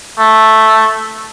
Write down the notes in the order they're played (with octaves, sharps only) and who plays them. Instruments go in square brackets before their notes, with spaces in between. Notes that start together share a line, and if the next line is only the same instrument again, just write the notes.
[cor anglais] A3